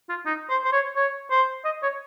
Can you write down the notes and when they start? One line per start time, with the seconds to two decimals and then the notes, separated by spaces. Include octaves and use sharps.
0.09 F4
0.26 D#4
0.50 C5
0.65 C5
0.73 C#5
0.96 C#5
1.31 C5
1.65 D#5
1.83 C#5